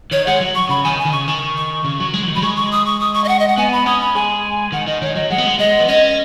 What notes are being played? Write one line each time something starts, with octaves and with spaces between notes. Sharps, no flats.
D#3 C#5
G#3 F#5
F#3
C#6
C#3 B5
D#3 G#5
G#5
D#3
C#3 C#6
D#3 C#6
C#6
C#3
F#3
G#3
F#3
D#3
F#3 B5
G#3 C#6
C#6
D#6
C#6
D#6
C#6
D#5
F#5
D#5
F#5
B3 G#5
B5
C#4 D#6
B5
G#3 G#5
D#3 F#5
D#3 D#5
D#3 C#5
F#3 D#5
G#3 F#5
B3
G#3
G#3 D#5
B3
C#4 D#5